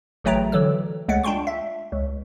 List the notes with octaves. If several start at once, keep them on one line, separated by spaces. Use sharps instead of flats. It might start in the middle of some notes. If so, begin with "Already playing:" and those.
A1 C#3 F#3 A3 G5 A#5
D3 E3 F#3 A4 E6
C#2 G#3 A3 F#5
D4 F4 G5 C6 C#6
E5
C#2